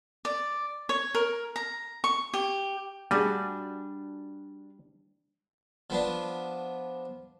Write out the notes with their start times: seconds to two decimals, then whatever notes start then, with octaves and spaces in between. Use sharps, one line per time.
0.25 D5
0.89 C#5
1.15 A#4
1.56 A#5
2.04 C#6
2.34 G4
3.11 G3 D4 F#4 G#4
5.90 F3 B3 D4